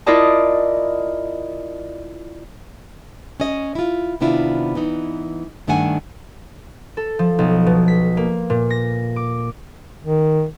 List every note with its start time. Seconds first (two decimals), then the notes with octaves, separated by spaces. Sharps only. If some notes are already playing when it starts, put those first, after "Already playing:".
0.06 E4 F4 A#4 D5 D#5 A5
3.40 C#4 D#5
3.75 E4 F4
4.20 C3 D#3 B3 D4 E4 F4
4.75 E3 B3 D#4
5.67 G2 D#3 A3 D4 F#5 G#5
6.97 A4
7.19 F3
7.39 B1
7.66 B2
7.88 B6
8.17 A#3
8.50 A#2
8.70 A#6
9.16 D6
10.05 D#3